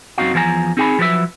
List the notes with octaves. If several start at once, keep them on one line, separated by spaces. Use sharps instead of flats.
F#2 C3 C4 D#4 F#4 F5
E2 F3 A4 A#4 G#5 A#5
C4 D#4 G#4 F#5 G#5 B5
F3 F#3 B4 D5 E5